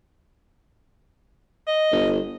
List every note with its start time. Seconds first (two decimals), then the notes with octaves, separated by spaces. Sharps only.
1.67 D#5
1.92 G1